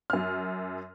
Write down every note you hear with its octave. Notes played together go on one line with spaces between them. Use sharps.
F#2 F6